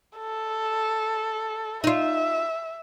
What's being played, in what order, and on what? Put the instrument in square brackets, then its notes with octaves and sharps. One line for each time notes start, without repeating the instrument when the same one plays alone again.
[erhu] A4
[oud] D#4 F4 [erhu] E5